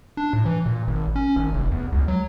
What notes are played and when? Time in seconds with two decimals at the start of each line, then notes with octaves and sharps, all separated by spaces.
0.17 D4
0.33 A2
0.46 E3
0.66 A#2
0.88 G#1
1.16 C#4
1.36 G#1
1.53 F1
1.72 E2
1.92 C#2
2.08 F#3